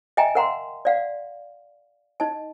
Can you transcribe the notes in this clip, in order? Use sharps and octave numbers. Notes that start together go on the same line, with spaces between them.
D#5 E5 G5 G#5 A#5
A#4 F5 F#5 A#5 C6
D5 F5 F#5
D#4 D#5 A5